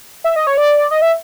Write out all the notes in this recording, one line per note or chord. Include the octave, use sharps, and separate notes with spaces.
E5
D#5
C#5
D5
D#5
E5